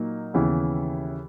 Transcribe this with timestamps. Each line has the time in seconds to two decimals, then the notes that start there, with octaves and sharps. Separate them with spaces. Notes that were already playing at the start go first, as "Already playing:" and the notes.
Already playing: A#2 F#3 A#3 D#4
0.34 D#2 C#3 E3 B3 E4